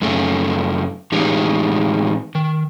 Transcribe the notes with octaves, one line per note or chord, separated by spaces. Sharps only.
F#2 C#3 A3
A2 E3 G#3 D#4 G4
D#3